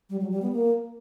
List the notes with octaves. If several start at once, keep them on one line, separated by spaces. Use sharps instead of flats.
G3
F#3
G3
B3
A#3